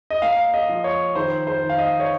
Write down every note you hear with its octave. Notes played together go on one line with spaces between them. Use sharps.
D#5
A#3 F5
D#5
F3
C#5
D#3 C5
C5
D#3
F5
D#5
C#5